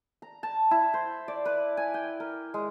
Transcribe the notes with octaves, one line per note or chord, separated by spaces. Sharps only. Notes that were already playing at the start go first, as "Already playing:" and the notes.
A#5
A5
E4
C5
D5
B4
G#5
G5
A#4
G#3